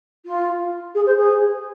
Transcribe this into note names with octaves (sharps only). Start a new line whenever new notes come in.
F4
G#4
C5
G#4